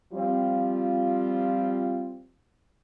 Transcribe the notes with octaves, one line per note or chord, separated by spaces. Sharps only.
F3 G3 C4 F4